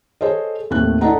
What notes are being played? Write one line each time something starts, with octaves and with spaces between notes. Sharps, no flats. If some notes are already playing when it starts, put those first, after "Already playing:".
G#4 A4 C5 C#5 D#5
D#2 A2 A3 C4 F#6
D4 E4 A4 D#5 F#5 A#5